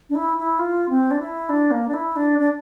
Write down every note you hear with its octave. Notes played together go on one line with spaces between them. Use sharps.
D4
E4
E4
F4
C4
D4
E4
D4
A#3
D4
E4
D4
D4